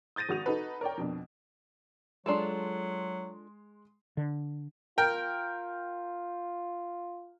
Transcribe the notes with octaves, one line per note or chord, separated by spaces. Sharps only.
D#6 G6 A6 A#6 D#7
G#1 F#4 D#6 F7
D#4 F#4 A4 B4
A#4 C#5 D5 G5
F2 B2 D4
F#3 G#3 D4 F4 A4 C6
D3
F4 A#4 G5